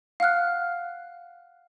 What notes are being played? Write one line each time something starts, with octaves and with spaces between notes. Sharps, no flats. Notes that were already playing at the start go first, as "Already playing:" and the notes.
F5 F#5 F6 F#6